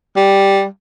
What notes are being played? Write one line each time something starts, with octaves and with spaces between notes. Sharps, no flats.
G3